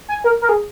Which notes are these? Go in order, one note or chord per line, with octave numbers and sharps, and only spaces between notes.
G#5
A#4
A#4
G#4